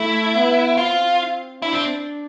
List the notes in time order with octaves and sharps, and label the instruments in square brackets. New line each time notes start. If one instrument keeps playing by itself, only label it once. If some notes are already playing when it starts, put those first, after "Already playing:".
Already playing: [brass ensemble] A3 [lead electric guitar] E4
[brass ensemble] B3
[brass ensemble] C4 [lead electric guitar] F4
[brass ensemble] D4 [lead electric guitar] E4
[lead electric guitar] C4